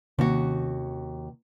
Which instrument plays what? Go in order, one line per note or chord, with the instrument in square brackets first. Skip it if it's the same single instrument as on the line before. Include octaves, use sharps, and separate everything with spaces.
[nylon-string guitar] D#2 F#4 [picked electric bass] C3 D#3 C#4